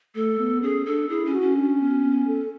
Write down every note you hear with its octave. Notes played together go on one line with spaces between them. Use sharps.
A3 A4
B3
C#4 G#4
D4 A4
E4 G#4
C#4
F#4
C#4
D4
B3
B3
A4